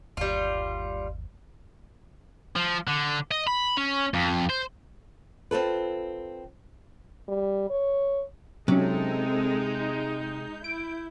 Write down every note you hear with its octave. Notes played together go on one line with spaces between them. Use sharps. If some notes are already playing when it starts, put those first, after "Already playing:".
G1 D#2 G3 F4
F3
D3
D#5
B5
C#4
F2
C5
C4 F4 A4 B4
G3
C#5
C3 F#3 G#3 C4 C#4 D#4 A4
G6
E4 D7